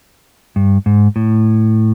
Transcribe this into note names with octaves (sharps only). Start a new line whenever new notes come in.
G2
G#2
A2